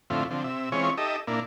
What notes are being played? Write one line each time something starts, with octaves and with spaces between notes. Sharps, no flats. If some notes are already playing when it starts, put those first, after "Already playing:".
F2 A2 D3 C4 E4 F4
D3 F3 C4
C3 E5
E3 G#3 C4 C#4 F4 C#5
D#4 G4 A4 D#5 E5
A#2 A#3 D4 E4